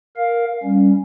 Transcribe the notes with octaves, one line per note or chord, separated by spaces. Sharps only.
A#4 F5
G3 C#4